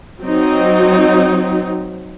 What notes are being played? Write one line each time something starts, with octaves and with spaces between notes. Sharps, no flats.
F#3 C4 D#4